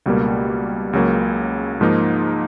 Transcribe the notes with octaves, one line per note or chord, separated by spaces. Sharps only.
C#2 B2 G3 A#3
C#2 C#3 F#3 A#3
G#2 F3 A#3 D#4